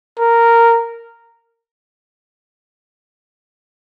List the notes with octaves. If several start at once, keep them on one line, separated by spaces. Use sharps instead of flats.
A#4